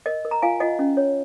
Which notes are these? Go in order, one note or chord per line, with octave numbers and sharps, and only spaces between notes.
A#4 D#5
A#4
A#5
F4 F5 G#5
F4 D#5 F#5
C#4
C#5